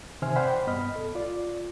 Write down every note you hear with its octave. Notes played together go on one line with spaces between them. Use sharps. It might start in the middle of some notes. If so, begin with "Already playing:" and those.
C3 D#3 C5 E5 G#5 F6
C5 D5 F#5 G5 B5
G2 B3 D#5 B5 F6
C2 A4
F4 D5